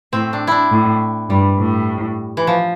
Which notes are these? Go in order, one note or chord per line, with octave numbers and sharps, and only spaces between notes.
A2 C4
D4
D4 E4
A2
G2 G3
A2
E3
F3